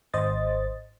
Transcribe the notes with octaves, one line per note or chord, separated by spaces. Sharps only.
G#1 C5 D#5 A6